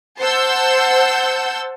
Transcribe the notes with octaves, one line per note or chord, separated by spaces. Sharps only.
C5 F#5 A5 E6 G6